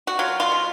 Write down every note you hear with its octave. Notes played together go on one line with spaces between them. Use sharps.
F#4
F#3 F4
F4
B2